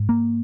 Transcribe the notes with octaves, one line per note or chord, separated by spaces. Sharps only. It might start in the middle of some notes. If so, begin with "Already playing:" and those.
Already playing: G#2
A#3